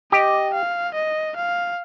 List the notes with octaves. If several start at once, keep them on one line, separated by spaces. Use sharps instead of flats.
G4 D#5
F5
D#5
F5